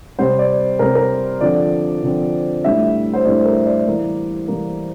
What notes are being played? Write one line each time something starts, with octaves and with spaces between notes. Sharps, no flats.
C3 G3 C4 C5
D5
C3 G3 C4 A#4
A#4
D3 F3 C4 D5
D3 F3 C4
A2 G3 D4 E5
C5
A2 G3 D4 D5
A#4
D5
E3 G3 A#3
E3 G3 A#3